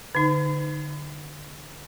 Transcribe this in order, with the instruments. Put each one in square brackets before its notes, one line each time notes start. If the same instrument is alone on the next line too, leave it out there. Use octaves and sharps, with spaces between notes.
[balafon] D3 D#4